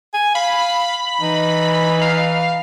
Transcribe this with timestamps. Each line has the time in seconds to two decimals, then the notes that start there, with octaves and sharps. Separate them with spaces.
0.14 G#5
0.35 F5 B5
1.21 E3 D#4
2.02 F5